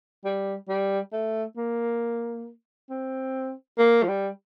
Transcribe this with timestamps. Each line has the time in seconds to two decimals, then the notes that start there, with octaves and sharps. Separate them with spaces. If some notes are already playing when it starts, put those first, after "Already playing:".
0.25 G3
0.69 G3
1.13 A3
1.57 A#3
2.90 C4
3.79 A#3
4.03 F3
4.08 G3